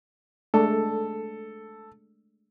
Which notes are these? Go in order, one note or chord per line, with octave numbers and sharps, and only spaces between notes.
G#3 A3 D4 A4